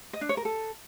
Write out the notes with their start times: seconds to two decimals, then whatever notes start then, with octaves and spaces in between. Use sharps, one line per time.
0.13 D#5
0.21 D4
0.29 C#5
0.37 A#4
0.45 A4